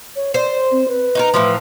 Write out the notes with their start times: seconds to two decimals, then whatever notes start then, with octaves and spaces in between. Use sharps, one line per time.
0.16 C#5
0.34 C5 D5
0.71 C4
0.88 B4
1.15 D#4 F#4 A#4
1.34 A2 E3 F3